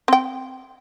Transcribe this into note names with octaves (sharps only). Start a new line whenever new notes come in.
C4 G5